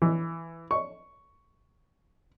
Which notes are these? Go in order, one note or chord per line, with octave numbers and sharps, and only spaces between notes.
E3
C#6